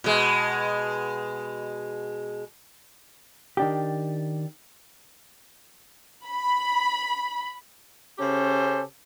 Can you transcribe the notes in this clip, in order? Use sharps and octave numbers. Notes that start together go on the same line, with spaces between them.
B2 G#3
D#3 D4 G4
B5
C#3 C#4 G4 A4 C5